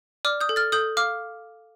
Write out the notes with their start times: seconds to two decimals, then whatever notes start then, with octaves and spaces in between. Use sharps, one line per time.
0.25 D5 D6 F6
0.41 D#6 G6
0.49 A4
0.56 F6 A6
0.72 A4 D#6 G6
0.97 F5 D6 F6